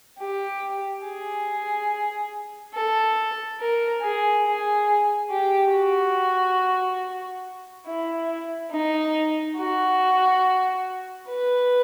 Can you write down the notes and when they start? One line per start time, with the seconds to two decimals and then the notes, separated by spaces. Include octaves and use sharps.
0.19 G4
1.03 G#4
2.74 A4
3.59 A#4
4.02 G#4
4.45 G#4
5.30 G4
5.72 F#4
7.86 E4
8.71 D#4
9.57 F#4
11.28 B4